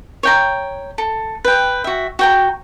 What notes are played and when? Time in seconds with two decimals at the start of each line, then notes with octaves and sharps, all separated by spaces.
0.23 C#5 G5 A#5
0.98 A4
1.45 B4 G5
1.84 F#4 E5
2.19 F#4 G5 A#5